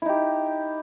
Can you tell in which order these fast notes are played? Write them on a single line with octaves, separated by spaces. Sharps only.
E4 D#4 G4